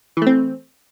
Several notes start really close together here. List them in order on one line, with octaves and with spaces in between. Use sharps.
E3 A3 C4